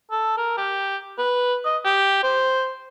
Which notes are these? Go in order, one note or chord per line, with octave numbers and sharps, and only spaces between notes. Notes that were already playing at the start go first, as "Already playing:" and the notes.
A4
A#4
G4
B4
D#5
G4
C5